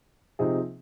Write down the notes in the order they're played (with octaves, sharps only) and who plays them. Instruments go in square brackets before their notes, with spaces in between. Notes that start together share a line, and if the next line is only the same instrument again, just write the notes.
[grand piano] C3 F3 C4 D#4 G#4